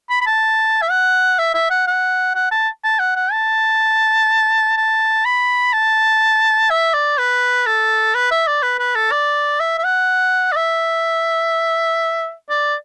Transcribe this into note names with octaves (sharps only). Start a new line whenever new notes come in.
B5
B5
A5
E5
F#5
E5
E5
F#5
F#5
F#5
A5
A5
F#5
F#5
A5
A5
B5
A5
E5
D5
B4
A4
B4
E5
D5
B4
B4
A4
D5
E5
E5
F#5
D5
E5
D5